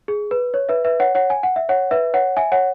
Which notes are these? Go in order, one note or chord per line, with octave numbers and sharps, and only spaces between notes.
G#4
B4
C#5
B4 E5
B4 E5
C#5 F#5
C#5 F#5
G#5
F#5
E5
C#5 F#5
B4 E5
C#5 F#5
E5 G#5
C#5 F#5